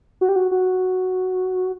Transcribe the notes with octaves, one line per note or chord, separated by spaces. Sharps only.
F#4
G4
F#4
F#4